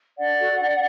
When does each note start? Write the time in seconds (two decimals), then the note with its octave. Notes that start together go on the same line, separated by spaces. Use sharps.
0.17 D4 D5 F#5
0.39 F#4 A4
0.60 D4